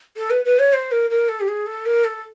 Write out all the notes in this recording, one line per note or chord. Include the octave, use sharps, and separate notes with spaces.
A4
B4
B4
C#5
C5
A#4
A#4
A4
G4
G#4
A4
A#4
A4